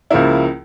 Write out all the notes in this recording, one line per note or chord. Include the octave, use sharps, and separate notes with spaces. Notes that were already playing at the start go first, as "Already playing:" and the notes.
C#2 C#3 F3 A#3 E4